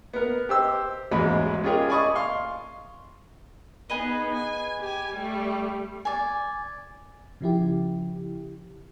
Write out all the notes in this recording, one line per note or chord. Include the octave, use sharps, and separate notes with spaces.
B3 A#4
G4 C5 E6
A1 E2 G#2 F#3 G#3 B5
C#4 F4 G4 G#4 A#4
D5 G#5 B5 C#6 D#6
F5 C6 C#6
B3 D#4 G#4 B4 D#5
G#5
G4 G#5
G3 A3
D5 G#5
C#3 F3 E4 G4